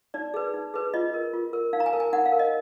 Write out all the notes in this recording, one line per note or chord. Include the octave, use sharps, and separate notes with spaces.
D#4 D5
G#4 B4
D#4
G#4 B4
F4 D#5
A#4
F4
A#4
D#4 F5
A#5
G#5
A#4
G#5
D#4 F#5
F5
A#4
D#5